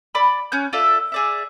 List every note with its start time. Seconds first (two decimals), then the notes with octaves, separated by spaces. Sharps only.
0.15 D5 B5
0.52 C#4 F#6 G6
0.73 F4 A4 D5 E5
1.12 G#4 D5 E5